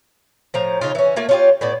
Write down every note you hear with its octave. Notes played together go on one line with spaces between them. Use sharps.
A2 F3 A#5
C#3 D#4 F4
E3 C#4
A3 A#3 F4
C#4 F4 G4
A2 B3 D5